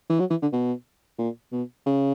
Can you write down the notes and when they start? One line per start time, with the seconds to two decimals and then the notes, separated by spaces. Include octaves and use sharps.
0.09 E3
0.20 F#3
0.30 E3
0.42 D3
0.53 B2
1.19 A#2
1.52 B2
1.86 C#3